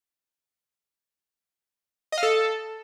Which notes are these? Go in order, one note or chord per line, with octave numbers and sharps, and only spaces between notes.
D#5
F5
A4